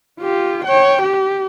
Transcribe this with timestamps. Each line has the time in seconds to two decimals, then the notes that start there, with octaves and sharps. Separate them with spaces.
0.20 F4 G4
0.65 C#5 G5
1.02 G4